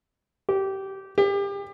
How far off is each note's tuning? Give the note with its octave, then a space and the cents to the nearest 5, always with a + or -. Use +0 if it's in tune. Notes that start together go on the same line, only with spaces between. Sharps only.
G4 -20
G4 +30